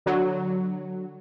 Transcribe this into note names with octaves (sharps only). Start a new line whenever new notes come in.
D3 F#3